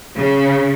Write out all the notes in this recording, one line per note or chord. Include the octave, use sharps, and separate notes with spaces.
C#3